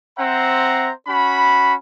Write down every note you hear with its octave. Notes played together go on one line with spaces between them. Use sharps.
C4 C5 E5 F#5 A#5
C#4 F#4 B5